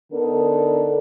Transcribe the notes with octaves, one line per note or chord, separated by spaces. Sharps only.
D3 B3 D4 D#4 A4 A#4